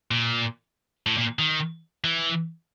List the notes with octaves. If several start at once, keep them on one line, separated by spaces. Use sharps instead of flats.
A#2
A2
A#2
D#3
E3